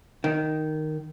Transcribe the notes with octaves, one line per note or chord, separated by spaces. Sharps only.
D#3